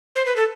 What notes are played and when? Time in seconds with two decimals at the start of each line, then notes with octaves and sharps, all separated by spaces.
0.16 C5
0.26 B4
0.36 A4